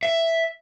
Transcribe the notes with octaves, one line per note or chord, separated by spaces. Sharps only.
E5